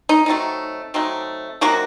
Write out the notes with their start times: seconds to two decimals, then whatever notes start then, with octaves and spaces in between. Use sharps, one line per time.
0.09 D#4
0.26 F#3 A3 C4 D#4
0.94 F#3 A3 C4 D#4
1.61 C3 F#3 A#3 D#4 F#4